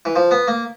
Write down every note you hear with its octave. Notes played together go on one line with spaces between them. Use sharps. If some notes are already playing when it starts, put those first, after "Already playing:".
E3
F3
B3
A#3